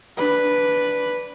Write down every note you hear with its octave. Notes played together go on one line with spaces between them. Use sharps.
D4 B4